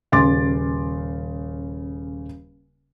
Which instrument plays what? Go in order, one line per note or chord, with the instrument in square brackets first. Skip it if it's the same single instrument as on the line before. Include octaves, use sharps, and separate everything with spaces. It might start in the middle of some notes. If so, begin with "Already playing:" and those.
[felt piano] D#1 C#3 C6 D6 A6